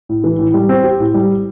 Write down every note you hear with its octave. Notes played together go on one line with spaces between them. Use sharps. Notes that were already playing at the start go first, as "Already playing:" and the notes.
A2
E3
A2
G3
C4
G4
A2
G3